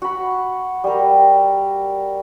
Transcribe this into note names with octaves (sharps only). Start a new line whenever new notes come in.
F#4 B5
G3 A#4